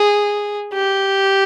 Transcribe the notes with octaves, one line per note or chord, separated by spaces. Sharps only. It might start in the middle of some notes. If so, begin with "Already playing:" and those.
Already playing: G#4
G4